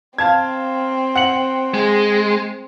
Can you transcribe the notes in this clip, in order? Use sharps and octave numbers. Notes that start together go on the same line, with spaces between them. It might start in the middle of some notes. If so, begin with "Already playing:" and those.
C4 F5 A5 G#6
F#5 C#7 F#7
G#3